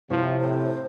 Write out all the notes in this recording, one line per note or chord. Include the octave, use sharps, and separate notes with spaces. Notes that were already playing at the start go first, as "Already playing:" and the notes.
C3 F3 E4 C#5
A2 C5